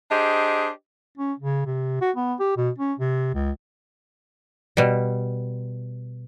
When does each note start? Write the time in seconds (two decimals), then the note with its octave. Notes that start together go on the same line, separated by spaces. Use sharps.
0.10 D4 G4 G#4 C5 D#5
1.18 C#4
1.39 C#3
1.66 C3
2.01 F#4
2.16 B3
2.40 G4
2.57 B2
2.79 C#4
2.99 C3
3.34 C#2
4.77 B2 G3